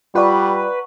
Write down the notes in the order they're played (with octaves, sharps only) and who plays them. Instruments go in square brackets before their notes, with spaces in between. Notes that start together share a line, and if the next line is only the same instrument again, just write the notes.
[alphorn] G3 [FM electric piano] F4 D5 [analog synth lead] B4 [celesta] F#5 A#5 C#6